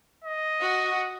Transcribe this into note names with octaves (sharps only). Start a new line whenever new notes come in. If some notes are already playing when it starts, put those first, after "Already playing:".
D#5
F#4